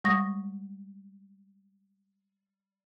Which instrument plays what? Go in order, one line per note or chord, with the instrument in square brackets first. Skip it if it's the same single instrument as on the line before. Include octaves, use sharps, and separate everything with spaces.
[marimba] G3 G#3 C#6 D#6 A#6